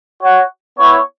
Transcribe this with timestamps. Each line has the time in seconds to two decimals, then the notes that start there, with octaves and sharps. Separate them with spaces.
0.21 F#4 C#5 F#5
0.79 B3 E4 C#5